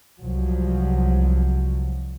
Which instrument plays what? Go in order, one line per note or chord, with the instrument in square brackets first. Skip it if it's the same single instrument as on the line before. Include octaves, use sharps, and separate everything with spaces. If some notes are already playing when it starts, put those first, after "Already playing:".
[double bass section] C2 F3 F#3